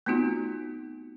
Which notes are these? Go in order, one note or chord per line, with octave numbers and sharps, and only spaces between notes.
A3 B3 C4 D#4 F4 F#4